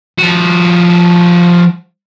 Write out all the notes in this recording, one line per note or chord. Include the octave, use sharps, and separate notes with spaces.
F3 F#4